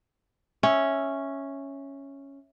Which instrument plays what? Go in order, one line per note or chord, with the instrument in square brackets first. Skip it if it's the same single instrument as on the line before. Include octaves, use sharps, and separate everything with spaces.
[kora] C#4 [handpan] E5